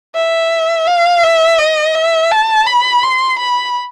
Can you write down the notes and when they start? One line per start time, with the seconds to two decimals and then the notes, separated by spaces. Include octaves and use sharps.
0.15 E5
0.87 F5
1.23 E5
1.59 D#5
1.96 E5
2.32 A5
2.67 B5
3.03 C6
3.39 B5